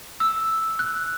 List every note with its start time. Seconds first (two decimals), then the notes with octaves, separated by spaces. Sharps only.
0.20 E6
0.79 F#6